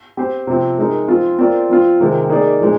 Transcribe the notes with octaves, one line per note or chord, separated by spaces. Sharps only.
C4 G4 C5
C3 F3 C4
G#3 D#4 A#4
F3 C4 F4
C4 F4 A#4 D5
F3 C4 F4
C3 D#3 G#3
A#3 D#4 G#4 D5
A#2 F3 G#3 D#4